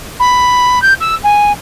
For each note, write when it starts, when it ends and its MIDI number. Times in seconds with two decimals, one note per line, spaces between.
0.20 0.82 83
0.82 0.94 91
1.01 1.15 88
1.24 1.52 80